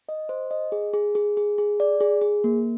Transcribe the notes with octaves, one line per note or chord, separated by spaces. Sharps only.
D#5
C5
D#5
G#4
G#4
G#4
G#4
G#4
D5
G#4
G#4
A#3